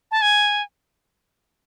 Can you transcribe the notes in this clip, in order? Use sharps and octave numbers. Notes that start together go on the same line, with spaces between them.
A5
G#5